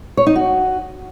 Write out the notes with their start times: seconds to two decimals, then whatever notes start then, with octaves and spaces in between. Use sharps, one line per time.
0.17 C#5
0.27 D#4
0.36 F#4